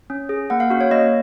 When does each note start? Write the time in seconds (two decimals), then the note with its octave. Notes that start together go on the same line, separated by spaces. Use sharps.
0.10 C#4
0.29 G#4
0.50 A#3 F#5
0.60 F5
0.70 C#4 F#4 F5
0.81 C#5
0.91 A#3 D#5